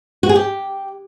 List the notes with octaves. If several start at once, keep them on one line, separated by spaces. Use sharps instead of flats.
F#4
G#4
G4